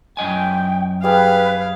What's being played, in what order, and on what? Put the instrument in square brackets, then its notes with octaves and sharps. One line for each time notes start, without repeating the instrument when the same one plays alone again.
[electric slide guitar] F#2 D#5 G#5 [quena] G5
[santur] G3 G#4 [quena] B4 [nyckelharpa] F5